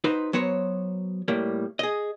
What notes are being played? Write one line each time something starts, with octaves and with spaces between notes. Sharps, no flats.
D#4 F#4 B4 C5
F#3 B3 C5 C#5
A2 G3 A#3
G#4 D#5